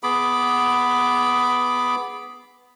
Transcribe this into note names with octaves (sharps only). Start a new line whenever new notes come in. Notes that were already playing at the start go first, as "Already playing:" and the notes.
B3 G#4 B5 D6